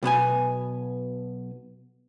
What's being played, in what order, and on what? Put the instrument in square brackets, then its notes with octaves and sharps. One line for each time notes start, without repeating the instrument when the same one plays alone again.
[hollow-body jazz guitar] B1 B2 B3 G#5